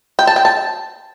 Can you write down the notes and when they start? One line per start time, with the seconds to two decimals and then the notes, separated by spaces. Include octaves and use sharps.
0.19 G5
0.27 A5
0.36 G5
0.45 A5